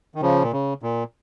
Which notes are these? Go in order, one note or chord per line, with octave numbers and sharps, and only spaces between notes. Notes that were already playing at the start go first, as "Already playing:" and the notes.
D#3
C#3 F3
A#2
C#3
A#2